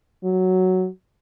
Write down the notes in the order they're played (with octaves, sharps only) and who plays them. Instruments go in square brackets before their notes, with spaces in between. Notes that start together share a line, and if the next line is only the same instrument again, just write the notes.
[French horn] F#3